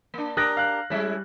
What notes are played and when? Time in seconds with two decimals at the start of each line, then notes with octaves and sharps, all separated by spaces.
0.14 A#3 D4
0.37 D4 G4 A#4 D#6 F#6 A#6
0.57 F5 F#6
0.90 G3 G#3 C#4 E4